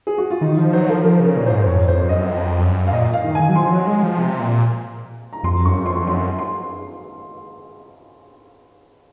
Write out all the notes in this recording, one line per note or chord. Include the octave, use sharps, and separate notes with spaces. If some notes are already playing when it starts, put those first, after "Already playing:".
G#4
F#4
F4
D#3 D#4
F3 D#4
F#3 C5
F3 A#4
F3 A#4
C#3 A#4
A#2 C#5
G#2 C5
C5
F2 C#5
F2 C5
F#2 D#5
F2
F#2
F5
A#2 D#5
F5
D#3
D#3 G#5
F#3
F3 C6
F#3
G#3
F3
C3
A#2
A#5
F2 C6
F#2 C#6
F2 C6
F#2 C6
C6